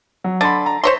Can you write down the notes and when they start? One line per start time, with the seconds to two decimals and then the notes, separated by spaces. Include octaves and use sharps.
0.24 F#3
0.41 D3 B5 C6 A6
0.66 A#5
0.84 C5 C#5 C6 A#6 B6